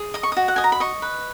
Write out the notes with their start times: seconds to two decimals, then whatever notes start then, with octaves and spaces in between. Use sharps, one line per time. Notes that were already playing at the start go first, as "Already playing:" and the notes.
Already playing: G#4
0.14 D#5 D#6
0.23 C#6
0.32 F#4 D#6
0.48 F#5
0.56 D#5 G#5
0.64 A#5
0.72 B5
0.80 D#5 C#6
1.02 B4